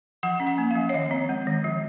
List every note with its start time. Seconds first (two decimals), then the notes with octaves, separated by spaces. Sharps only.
0.23 F3 F#5
0.40 C#4
0.47 F#5
0.58 A#3
0.71 F5
0.76 F3
0.89 C#5
0.94 D#3 D#5
1.11 C4
1.29 G#3
1.47 D#3
1.65 F3